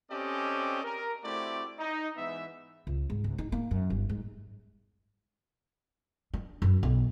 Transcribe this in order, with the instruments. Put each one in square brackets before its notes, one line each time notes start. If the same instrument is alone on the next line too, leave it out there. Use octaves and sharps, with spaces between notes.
[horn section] C4 C#4 G4 A4 D5 D#5
A#4
A3 C4 E4 F#4 G4 D5
D#4
G#2 E3 B3 E5
[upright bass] C#2
G#2
C#2
D#4
A#3
F#2
G1
G#2
D4
F#2
B1